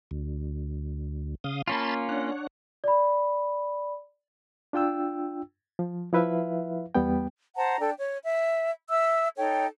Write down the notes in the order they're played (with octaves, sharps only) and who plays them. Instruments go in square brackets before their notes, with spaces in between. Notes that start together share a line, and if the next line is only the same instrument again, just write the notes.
[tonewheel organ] D2
C#3 F5 D#6
[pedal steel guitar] A#3 C#4 F4 [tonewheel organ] A5 B5 C6
[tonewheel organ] D4 C#5 F#5
[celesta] D5 B5
[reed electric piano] D4 F4 G5 E6
F3
F3 E4 B4 E5 F5
E2 G3 B3 G5
[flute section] C5 F#5 A5 A#5
D4 A4 G5
C#5
E5
E5 E6
D#4 A4 C#5 G5